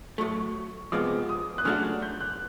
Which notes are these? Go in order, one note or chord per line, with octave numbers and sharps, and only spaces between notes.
A2 F#3 A3 C#6
C3 F3 G#3 B3 D6
D#6
F#6
C#3 F#3 A3 D4 F#4 F6
F#6
G6
F#6